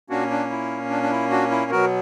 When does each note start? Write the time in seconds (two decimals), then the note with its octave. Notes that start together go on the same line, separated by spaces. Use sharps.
0.10 A#2 A#3 C#4 D4 F#4
0.30 D4
0.50 E4
0.90 D4
1.03 D4
1.11 E4
1.30 D4 F#4
1.51 E4
1.71 B2 F#3 B3 F#4 A#4